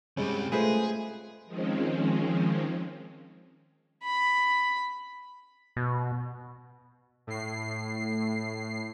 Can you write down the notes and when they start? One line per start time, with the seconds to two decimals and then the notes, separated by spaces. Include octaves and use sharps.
0.17 G2 C3 G3 G#3 C#4
0.52 G#3 A3 F4 G#4 B4 C5
1.46 D#3 F3 G#3 C4 C#4
4.04 B5
5.76 B2
7.27 A2 C7